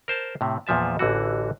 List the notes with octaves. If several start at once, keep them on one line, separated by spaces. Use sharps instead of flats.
A#4 C5 A5
A2 C3
E2 A#2 F3 E5 A5
A1 D3 E3 F#4